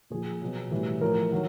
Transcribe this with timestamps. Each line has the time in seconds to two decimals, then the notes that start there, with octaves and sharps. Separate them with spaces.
0.10 A#2 F3 G#4
0.42 B2 F#3
0.71 A2 E3 G3
1.01 A2 F3 A#4
1.32 D#3 F#3